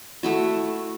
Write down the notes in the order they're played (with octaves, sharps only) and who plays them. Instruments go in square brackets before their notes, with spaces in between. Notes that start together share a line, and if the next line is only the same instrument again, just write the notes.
[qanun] A3 E4 F#4